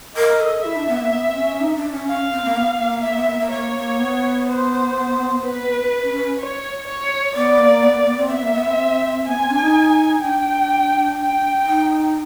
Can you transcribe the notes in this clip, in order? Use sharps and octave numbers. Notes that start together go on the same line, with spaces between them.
A#4 D#5
A4
E4 E5
D4
B3
A#3
B3
C4
C#4
D#4
D4
C#4
C#4 F5
C4
A#3
B3
A#3
A#3 E5
B3
A#3
A#3
A#3 C#5
A#3
B3
C5
B4
C#4
C#4
C#5
C#5
B3 D5
A#3
B3
A#3
B3
C4
B3 E5
A#3
B3
C4
B3 G#5
C4
D4
D#4
D4 G5
G5
D#4